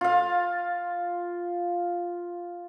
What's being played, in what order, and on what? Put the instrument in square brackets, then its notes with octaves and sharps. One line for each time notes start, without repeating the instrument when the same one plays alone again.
[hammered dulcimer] F4 F5